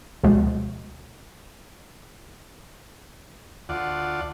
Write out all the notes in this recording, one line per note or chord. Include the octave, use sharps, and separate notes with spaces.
D2 B2 F3 G#3
D2 F4 D5 F#5